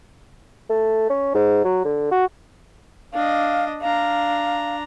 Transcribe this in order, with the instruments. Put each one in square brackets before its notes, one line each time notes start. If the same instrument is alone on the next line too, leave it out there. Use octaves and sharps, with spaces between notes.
[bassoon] A3
C#4
G#2
F#3
D3
F#4
[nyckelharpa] D4 D#5 [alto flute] F5
[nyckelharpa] D4 A#5 [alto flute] F5